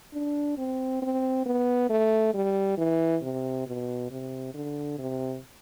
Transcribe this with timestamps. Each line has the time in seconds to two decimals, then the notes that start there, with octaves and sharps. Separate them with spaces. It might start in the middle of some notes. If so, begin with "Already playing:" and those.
0.13 D4
0.58 C4
1.02 C4
1.46 B3
1.90 A3
2.34 G3
2.78 E3
3.22 C3
3.67 B2
4.11 C3
4.54 D3
4.99 C3